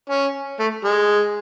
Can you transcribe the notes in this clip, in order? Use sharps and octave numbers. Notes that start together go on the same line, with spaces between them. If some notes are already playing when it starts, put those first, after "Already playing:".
C#4
A3
G#3